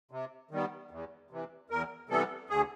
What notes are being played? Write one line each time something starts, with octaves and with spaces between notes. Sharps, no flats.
C3
D#3 G3 B3
E2
C3 E3
E2 A#4
C3 E3 G3 B3 A4
D2 G#4